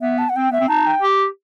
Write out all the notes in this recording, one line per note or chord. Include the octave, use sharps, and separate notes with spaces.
B3 E5
A5
F#5
C4 G5
B3 E5
C4
D#4 A5
G5
G4